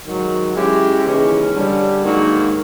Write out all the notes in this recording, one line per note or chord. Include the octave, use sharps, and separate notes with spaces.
G#2 D#3 F#3
G#3 C#4 E4 G4
D#2 C#3 E3 G#3 C#4
G2 D3 G3
G#2 D#3 F#3 A#3